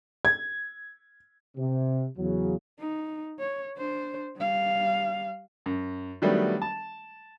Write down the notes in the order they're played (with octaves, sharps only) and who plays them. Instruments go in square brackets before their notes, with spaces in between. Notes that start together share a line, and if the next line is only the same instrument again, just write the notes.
[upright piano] G#6
[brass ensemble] C3
E2 C#3 F#3
[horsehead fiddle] D#4
C#5
D4 C5
G3 F5
[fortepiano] F#2
D#3 F#3 G3 A3 B3 D4
A5